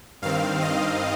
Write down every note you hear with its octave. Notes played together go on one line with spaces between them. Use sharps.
G2 D#3 C4 F5
D#5